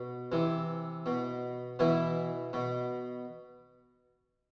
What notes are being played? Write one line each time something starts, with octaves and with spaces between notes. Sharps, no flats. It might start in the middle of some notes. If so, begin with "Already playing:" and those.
Already playing: B2
C3 E3
B2
B2 E3 E4
B2